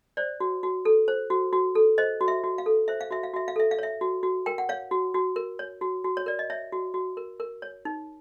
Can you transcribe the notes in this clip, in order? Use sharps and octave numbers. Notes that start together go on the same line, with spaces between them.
C5 D5
F#4
F#4
A4
C5
F#4
F#4
A4
C5 D#5
F#4
E5
F#4
F5
A4
C5 E5
F5
F#4 E5
F5
F#4 E5
F5
A4 E5
F5
C#5 E5
F#4
F#4
A#4 G5
F#5
C#5 F5
F#4
F#4
A#4
C#5
F#4
F#4
C#5
A#4 D5
D#5
C#5 E5
F#4
F#4
A#4
A#4
C#5
D#4